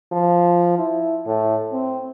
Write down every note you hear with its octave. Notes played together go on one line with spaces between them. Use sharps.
F3
E4
A2
C4